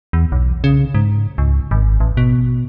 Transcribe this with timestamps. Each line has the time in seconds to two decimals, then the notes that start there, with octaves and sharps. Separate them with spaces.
0.13 E2
0.32 B1
0.64 C#3
0.95 G#2
1.38 C#2
1.71 G#1
2.00 A1
2.17 B2